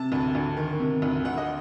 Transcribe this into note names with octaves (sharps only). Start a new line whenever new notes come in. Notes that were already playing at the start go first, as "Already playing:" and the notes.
Already playing: C3 A5
D2
D2
D#3
C3
D2
D2 F#5
D#5